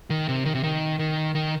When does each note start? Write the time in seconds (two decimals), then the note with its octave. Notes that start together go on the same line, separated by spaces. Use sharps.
0.10 D#3
0.29 C3
0.45 D#3
0.55 C3
0.63 D#3
0.99 D#3
1.35 D#3